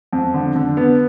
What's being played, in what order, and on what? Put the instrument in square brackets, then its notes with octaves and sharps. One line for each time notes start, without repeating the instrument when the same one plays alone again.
[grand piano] F2
D3
D3
B3